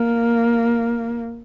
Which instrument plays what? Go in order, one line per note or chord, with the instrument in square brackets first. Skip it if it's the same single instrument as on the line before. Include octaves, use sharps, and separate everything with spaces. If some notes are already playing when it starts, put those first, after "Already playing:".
Already playing: [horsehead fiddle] A#3